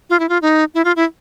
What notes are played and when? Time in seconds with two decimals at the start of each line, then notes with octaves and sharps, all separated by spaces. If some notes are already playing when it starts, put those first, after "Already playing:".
0.10 F4
0.20 E4
0.29 F4
0.42 D#4
0.74 E4
0.85 F4
0.96 E4